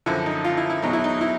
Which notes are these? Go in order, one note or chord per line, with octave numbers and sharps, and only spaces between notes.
F#2 D3 F3 E4
D#4
F4
E4
E4
E2 B2 F#3 D#4
E4
D#4
E4